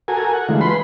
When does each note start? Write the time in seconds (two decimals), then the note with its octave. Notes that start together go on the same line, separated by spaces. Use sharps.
0.08 F#4 A4 A#4 G#5
0.33 F#5
0.48 D3 E3 G#3 A3 F4
0.61 B4 B5 C6